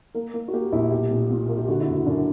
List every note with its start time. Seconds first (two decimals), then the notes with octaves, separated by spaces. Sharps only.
0.14 A#3 A#4
0.34 A#3
0.48 F#4
0.53 A#3 G4
0.72 A#1 E4
0.91 B1 G4
1.11 A#2
1.30 A#2
1.49 A#3
1.58 G4
1.68 D3 F#4
1.81 E4
1.88 F#1
1.94 F#4
2.06 F#2 D4